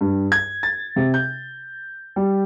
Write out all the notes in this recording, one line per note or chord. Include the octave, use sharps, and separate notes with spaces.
G2
G#6
A6
C3
G6
G3